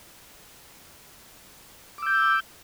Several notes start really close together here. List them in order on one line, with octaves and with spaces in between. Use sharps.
D6 E6 G6